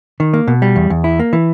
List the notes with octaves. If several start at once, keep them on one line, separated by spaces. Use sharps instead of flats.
D#3
A#3
B2
G3
E2
E2
E4
A#3
E3